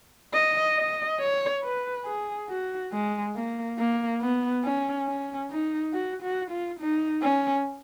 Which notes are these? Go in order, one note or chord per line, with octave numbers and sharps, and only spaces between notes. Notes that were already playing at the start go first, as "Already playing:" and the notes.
D#5
D#5
C#5
B4
G#4
F#4
G#3
A#3
A#3
B3
C#4
C#4
D#4
F#4
F#4
F4
D#4
C#4